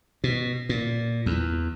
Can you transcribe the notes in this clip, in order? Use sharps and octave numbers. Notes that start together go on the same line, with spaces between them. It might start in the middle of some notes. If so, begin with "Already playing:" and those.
B2
A#2
E2